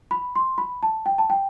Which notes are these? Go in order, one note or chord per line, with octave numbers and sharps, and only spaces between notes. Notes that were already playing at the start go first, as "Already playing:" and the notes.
B5
C6
B5
A5
G5
A5
G5